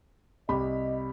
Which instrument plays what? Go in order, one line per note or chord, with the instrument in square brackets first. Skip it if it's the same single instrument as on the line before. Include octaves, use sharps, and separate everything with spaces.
[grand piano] C2 [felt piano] G4 B5 [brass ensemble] D#5